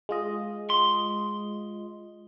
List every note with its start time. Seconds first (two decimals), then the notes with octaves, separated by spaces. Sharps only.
0.09 G#3 F4 D#5
0.70 C6